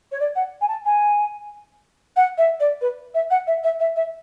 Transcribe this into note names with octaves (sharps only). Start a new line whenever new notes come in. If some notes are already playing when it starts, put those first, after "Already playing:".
C#5
D5
F#5
G#5
A5
G#5
F#5
E5
D5
B4
E5
F#5
E5
E5
E5
E5